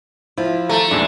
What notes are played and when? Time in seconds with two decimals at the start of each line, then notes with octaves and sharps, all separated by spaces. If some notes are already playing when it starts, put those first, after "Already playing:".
0.37 F3 E4
0.69 A3 A#5
0.91 A#1 E2 G#2 D4